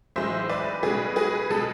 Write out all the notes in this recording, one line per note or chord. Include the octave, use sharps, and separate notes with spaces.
B1 A2 E3 G#3 C5 E5
B4 D5
B1 B2 G#3 G#4 B4
G#4 B4
B2 G#3 A4